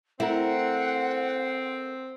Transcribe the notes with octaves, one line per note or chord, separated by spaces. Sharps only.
A3 C4 E4 A#4 F#5